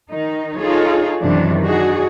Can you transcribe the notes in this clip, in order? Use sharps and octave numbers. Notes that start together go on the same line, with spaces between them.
D#3 D#4
D#4 F4 G#4 A4 C#5
F#2 C3 D#3 E3 D4
D4 D#4 F#4 G#4